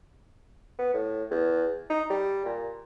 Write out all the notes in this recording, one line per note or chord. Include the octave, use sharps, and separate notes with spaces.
B3
A2
E2
D#4
G3
A#2